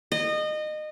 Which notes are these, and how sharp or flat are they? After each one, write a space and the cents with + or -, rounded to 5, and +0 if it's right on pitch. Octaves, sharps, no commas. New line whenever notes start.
D#5 -25